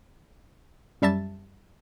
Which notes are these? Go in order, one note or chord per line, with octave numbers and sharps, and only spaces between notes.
F#2 G3 E5 A5 A6